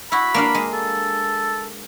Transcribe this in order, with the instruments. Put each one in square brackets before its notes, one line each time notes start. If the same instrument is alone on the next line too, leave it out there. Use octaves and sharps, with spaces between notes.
[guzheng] E4 F#4 [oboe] B5
[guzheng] A#3 D4 F5
G#3
[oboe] A4